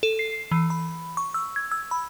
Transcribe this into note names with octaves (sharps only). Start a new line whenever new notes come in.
A4
C7
E3
B5
C#6
E6
G#6
E6
B5